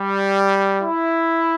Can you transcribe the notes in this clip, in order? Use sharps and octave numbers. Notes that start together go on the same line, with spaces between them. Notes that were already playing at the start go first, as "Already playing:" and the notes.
Already playing: G3
E4